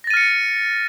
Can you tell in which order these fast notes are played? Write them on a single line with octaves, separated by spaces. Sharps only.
A#6 A6 D#7 F6 C#7